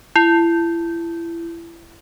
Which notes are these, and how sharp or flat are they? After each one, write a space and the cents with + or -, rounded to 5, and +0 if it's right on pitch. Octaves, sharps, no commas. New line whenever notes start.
E4 +30